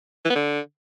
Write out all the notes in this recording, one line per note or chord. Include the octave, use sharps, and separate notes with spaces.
E3
B3
D3